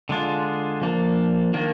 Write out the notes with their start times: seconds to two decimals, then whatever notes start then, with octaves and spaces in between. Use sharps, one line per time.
0.09 D3 G#3 D4 F4
0.82 F3 A#3 D4
1.54 D#3 A#3 D4